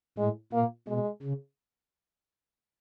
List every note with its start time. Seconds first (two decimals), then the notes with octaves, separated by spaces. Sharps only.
0.18 A2 G#3
0.53 A#2 A#3
0.88 B2 G#3
1.23 C#3